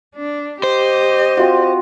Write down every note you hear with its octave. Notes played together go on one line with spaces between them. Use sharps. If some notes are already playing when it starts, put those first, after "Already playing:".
D4
G4 C5 D#5
C4 F4 F#4